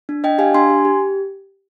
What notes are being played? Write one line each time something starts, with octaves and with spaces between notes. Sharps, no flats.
D4
D4 D#5 G5
G4 F5 G#5
D4 G#5 C6
G4
G4